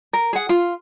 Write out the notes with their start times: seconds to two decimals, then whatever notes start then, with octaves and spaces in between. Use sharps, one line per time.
0.13 A#4
0.33 G#4 F#5
0.49 F4